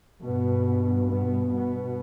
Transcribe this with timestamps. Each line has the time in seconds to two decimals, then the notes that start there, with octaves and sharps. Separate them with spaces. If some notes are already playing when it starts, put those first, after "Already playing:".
0.23 G2 B2 B3
1.09 B2 B3
1.51 B2 B3